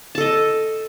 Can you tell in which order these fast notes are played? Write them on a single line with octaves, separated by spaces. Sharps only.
A5 A4 D#5